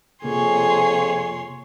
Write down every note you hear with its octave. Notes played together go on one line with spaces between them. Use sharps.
F2 C3 A#3 G#4 C#5 C6